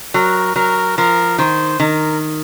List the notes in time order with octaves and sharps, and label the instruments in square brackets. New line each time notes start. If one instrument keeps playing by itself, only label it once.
[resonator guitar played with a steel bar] F#3 [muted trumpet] A#4
[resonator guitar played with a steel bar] F#3 [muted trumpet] A#4
[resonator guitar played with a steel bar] F3 [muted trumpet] A#4
[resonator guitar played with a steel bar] D#3 [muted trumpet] C5
[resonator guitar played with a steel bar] D#3 [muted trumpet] A#4